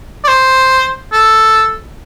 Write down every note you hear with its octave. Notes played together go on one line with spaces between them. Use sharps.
D5
C5
A4